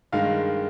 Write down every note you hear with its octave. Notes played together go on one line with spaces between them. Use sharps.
G2 D#3 G#3 F5